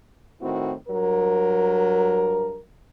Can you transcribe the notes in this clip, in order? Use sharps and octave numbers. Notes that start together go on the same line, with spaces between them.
A2 D#3 C4 E4 F#4
G2 F#3 A#4